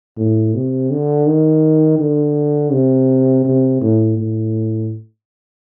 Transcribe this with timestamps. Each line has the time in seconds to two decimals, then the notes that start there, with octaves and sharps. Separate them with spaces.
0.17 A2
0.54 C3
0.90 D3
1.26 D#3
1.98 D3
2.72 C3
3.45 C3
3.81 A2
4.17 A2